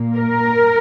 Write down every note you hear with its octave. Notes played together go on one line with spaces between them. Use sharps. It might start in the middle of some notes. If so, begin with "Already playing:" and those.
Already playing: A#2 A#3
A#4